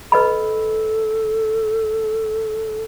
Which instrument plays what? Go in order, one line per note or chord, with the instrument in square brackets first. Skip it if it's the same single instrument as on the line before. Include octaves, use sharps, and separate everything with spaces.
[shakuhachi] A4 [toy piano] B4 D#5 B5